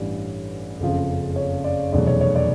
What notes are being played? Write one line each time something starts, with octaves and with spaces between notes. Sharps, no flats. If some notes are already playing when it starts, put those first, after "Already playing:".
Already playing: A1 G2 E3 G3 D5
F#1 F2 C#3 F3
C#5
D5
F1 E2 B2 F#3 D5
C#5
C#5
D5